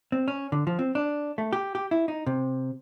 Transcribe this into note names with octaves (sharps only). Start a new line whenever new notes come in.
C4
C#4
D3
F3
C4
D4
A3
G4
G4
E4
D#4
C3